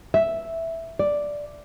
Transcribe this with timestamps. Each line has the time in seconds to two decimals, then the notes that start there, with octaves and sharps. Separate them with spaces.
0.14 E5
0.99 D5